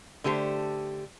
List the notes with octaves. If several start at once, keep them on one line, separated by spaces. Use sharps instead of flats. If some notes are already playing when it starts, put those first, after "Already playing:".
D3 A3 G4 C5